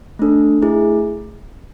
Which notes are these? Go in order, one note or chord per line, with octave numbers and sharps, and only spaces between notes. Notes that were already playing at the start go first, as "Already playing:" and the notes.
A3 D4 A4
A3 E4 G#4